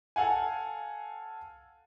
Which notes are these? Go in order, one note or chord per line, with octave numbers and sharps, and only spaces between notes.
A4 F5 F#5 G#5